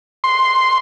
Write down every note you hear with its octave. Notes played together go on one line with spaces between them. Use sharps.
C6